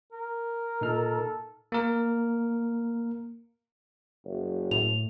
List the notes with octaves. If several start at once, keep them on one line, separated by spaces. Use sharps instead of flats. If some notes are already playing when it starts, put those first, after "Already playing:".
A#4
A#2 D#4 A4 F6
A#3 A#4
F#1
A2 F7